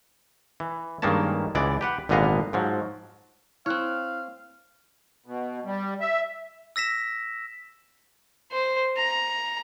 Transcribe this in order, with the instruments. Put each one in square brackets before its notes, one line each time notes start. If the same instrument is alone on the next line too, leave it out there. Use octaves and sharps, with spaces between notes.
[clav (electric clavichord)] E3
G2 D#3 G#3 A#3 C#4 A5
C#2 E3 G#3 D5
G4 B4 F#5
G#1 A#2 D3 B3 D#5 F5
G#2 F3 F#3
[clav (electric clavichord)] C4 C#5 [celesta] E4 F6 F#6 [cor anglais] F5
[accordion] B2
G3
E5
[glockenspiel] E6 A#6 B6 E7
[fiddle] C5
A#5